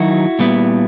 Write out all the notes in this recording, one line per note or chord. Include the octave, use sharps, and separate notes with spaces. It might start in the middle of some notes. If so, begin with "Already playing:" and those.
Already playing: D#3 F#3 D#4 E4 F#4
A#2 G3 B3 E4